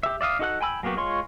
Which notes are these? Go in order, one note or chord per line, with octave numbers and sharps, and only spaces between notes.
G4 E5
D5 E5 F5 D#6
D#4 F#4 A4 F#5 F#6
G5 G#5 B5 E6
F#3 A#3 B3 F#4 G4
G#3 F4 C#5 C6 C#6